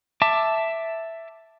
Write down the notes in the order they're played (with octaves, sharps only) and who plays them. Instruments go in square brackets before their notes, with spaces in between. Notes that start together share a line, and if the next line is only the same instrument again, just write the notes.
[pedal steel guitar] E5 A5 D6